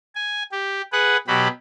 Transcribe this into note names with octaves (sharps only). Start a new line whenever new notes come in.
G#5
G4
G#4 B4 F#5
B2 F#3 G4 B5